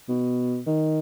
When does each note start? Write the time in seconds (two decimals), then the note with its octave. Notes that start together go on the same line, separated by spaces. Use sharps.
0.08 B2
0.66 D#3